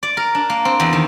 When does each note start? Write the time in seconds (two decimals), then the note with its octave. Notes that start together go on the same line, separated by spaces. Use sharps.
0.03 D5
0.17 A#4
0.35 D4
0.50 A#3
0.65 C4
0.80 E2
0.93 D#3